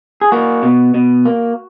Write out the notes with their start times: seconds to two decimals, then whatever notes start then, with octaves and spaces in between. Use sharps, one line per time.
0.21 G#4
0.32 A#3 F#4
0.63 B2
0.94 B2
1.26 A#3